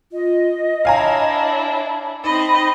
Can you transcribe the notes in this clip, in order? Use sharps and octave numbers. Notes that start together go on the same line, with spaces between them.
F4 D#5
D4 E4 C#5 F5 G#5 A#5
C4 D#4 D#5 B5